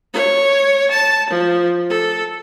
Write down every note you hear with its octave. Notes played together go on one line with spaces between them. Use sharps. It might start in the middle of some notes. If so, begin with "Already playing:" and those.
C#5
A5
F3
A4